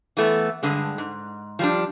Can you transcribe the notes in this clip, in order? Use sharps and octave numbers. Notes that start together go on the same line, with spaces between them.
E3 A3 B3
G2 D3 G#3
G#2
F3 G3 D4